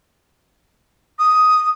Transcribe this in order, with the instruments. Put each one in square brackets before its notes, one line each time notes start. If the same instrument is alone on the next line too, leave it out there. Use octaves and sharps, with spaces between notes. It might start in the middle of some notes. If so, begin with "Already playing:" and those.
[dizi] D#6